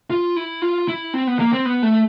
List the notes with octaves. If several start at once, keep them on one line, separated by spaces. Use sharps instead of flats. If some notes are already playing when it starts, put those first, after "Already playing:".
F4
E4
F4
E4
C4
B3
A#3
C4
B3
A3